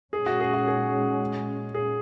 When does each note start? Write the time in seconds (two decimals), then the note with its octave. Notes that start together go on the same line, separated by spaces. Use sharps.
0.13 A#2 G#3 C#4 G#4
0.26 F#4
0.40 G#4
0.54 F#4
0.67 G#4
1.74 G#4